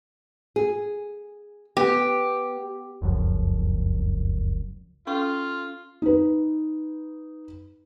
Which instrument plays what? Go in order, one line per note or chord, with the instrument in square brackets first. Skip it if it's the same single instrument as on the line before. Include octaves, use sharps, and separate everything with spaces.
[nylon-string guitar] G#4
[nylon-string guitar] B3 [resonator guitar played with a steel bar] G4
[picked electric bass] F1 C#2 F#2 F3
[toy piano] C#4 A4 C#6 [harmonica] F4
[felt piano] D#4 B4